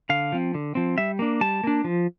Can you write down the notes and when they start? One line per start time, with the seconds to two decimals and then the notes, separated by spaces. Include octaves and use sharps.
0.09 D3 F5
0.32 F3 C4
0.54 D3
0.75 F3 C4
0.98 G3 E5
1.19 A#3 D4
1.41 G3 A5
1.64 A#3 D4
1.84 F3